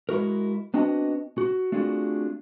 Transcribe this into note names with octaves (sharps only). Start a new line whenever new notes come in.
G#3 E4 F#4 A#4
B3 C4 D4 F#4 D#5
F#4
A3 C4 D4 F4 F#4 G#4